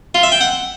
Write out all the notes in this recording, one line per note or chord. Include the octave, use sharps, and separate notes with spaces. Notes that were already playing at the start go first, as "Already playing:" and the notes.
F4
E5
G5
F#5